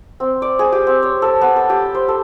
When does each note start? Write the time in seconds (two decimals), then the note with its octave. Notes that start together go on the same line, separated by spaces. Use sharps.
0.20 C4
0.42 D5
0.59 G#4
0.72 G4
0.87 C4
1.03 C#5
1.22 A4
1.41 B3
1.56 A4
1.70 G4
1.95 C5
2.08 A4